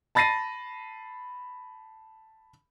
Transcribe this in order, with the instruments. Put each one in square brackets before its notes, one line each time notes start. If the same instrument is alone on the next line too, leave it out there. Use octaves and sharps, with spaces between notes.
[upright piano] A5 B5 A6 A#6 C7 D#7